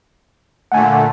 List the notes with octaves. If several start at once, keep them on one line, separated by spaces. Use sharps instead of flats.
A#2 D3 A3 F#5 G#5